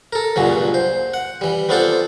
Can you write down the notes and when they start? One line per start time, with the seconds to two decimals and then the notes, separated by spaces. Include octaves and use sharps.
0.12 A4 A#4
0.36 C#2 G2 A#2 C#3 F#3
0.74 C5
1.14 F#5
1.41 E3 G3
1.69 B3 C4 D4 F4 A4 C5